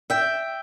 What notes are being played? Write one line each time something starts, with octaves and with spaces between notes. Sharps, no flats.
E5 G5